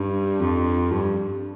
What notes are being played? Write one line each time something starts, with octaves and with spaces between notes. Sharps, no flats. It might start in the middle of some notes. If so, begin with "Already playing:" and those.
Already playing: G2
F2
G2